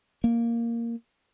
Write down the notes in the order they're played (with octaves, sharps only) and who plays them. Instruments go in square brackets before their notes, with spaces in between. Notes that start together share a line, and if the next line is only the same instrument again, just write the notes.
[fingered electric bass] A#3